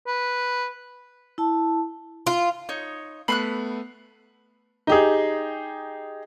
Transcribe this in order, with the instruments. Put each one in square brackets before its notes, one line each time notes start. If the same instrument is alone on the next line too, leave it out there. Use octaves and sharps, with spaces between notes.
[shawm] B4
[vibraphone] E4 A5
[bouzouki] F4
[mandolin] D#4 C#5
[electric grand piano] A3 B3 C7 [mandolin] B5 C6 F#6
[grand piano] D#4 G4 G#4